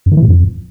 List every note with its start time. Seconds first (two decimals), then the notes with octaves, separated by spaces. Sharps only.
0.06 F#2
0.11 D#3
0.17 E3
0.22 A2
0.28 F2